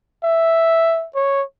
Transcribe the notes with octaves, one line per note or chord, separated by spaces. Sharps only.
E5
C#5